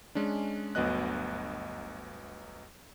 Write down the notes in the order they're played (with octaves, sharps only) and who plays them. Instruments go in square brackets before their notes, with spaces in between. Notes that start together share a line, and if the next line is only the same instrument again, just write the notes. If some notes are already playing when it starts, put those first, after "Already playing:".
[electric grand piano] G#3 C#4 D4
G1 D2 F#3 B3 D#5 F#6